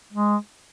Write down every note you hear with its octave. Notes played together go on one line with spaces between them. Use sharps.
G#3